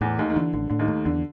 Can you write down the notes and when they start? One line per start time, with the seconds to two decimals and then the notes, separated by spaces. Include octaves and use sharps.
0.01 E2 A2 E3
0.19 D#2 D#3 A3
0.30 D#3
0.36 D3 E3
0.54 A1 D3
0.70 A2 D3
0.79 D#2 D#3
0.88 A3
1.05 E2 D3